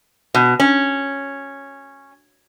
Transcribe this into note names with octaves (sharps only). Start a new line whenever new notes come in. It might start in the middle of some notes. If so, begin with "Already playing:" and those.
B2
C#4